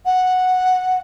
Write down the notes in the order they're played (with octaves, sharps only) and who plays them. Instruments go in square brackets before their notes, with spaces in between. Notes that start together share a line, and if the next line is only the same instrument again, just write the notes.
[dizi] F#5